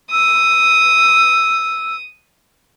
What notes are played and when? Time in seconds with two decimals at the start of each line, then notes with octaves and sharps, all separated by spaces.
0.12 D#6 E6